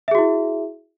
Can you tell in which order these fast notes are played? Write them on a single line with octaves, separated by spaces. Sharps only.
E5 G#4 F#4 E4